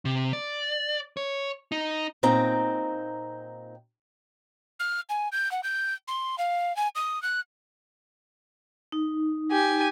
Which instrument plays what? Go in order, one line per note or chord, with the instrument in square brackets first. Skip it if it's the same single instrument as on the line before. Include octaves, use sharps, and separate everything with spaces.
[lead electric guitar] C3
D5
C#5
D#4
[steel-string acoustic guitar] A#2 C4 D#4 G5 A#5
[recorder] F6
G#5
G6
F#5
G6
C6
F5
G#5
D#6
F#6
[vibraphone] D#4
[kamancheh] G4 G#5